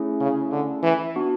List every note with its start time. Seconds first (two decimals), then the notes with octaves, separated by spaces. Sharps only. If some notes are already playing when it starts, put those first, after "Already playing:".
Already playing: A3 C#4 E4 G#4
0.20 C#3
0.52 D3
0.83 E3
1.16 B3 D4 F#4